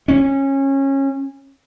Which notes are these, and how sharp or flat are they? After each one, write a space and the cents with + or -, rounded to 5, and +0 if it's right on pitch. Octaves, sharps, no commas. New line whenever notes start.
C#4 -20